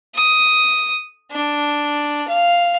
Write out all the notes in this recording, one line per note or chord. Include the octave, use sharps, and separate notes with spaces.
D#6
D4
F5